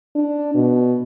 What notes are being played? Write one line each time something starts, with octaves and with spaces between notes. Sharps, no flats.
D4
B2